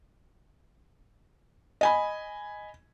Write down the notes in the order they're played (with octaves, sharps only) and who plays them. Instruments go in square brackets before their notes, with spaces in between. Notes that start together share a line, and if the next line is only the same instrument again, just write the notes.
[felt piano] D#5 G#5 B5